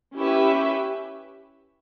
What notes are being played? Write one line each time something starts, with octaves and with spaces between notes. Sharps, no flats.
C#4 E4 G4 B4 E5